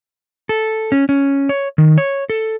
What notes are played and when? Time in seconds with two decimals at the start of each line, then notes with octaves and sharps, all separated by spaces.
0.49 A4
0.92 C#4
1.09 C#4
1.49 C#5
1.78 D#3
1.98 C#5
2.30 A4